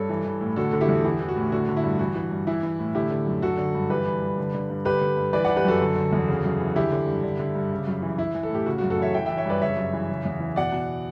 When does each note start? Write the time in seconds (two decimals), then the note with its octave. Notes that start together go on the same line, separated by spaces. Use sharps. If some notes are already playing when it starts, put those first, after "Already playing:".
Already playing: G2 A4 C#5
0.09 E3
0.25 E3
0.41 A2
0.56 D3 F#4 A4
0.73 D3
0.81 E4 G4
0.88 E2
1.04 E3 E4 G4
1.21 E3
1.28 F#4
1.36 A2
1.52 D3 F#4
1.69 D3
1.77 E4
1.83 G2
1.99 E3 F#4
2.16 E3
2.31 G2
2.47 E3 E4
2.63 E3
2.79 A2
2.95 D3 E4 G4
3.10 D3
3.27 F#2
3.42 D3 F#4 A4
3.58 D3
3.75 G2
3.90 E3 G4 B4
4.05 E3
4.22 G2
4.38 D3
4.54 D3
4.70 G2
4.85 D3 G4 B4
5.01 D3
5.17 G2
5.33 E3 B4 D5
5.45 E3 D5 F#5
5.57 G4 B4
5.65 F#2 F#4 A4
5.81 D3
5.96 D3
6.12 E2
6.28 C#3
6.44 F#2
6.60 E3
6.76 D3 E4 G4
6.92 D3
7.07 G2
7.24 D3
7.39 D3
7.55 G2
7.71 C#3
7.87 F#2
8.02 E3
8.18 E3 E4
8.35 E3
8.43 A4
8.50 A2 G4
8.66 C#3 F#4
8.78 F#4
8.82 F#2
8.90 F#4 A4
8.98 E3 C#5 E5
9.13 E3 E5 G5
9.25 E3 E5 G5
9.37 C#5 E5
9.46 G2 B4 D5
9.61 C#3 C#5 E5
9.77 F#2
9.93 E3
10.09 C#3
10.25 E2
10.40 E3
10.56 B2 D5 F#5
10.72 B2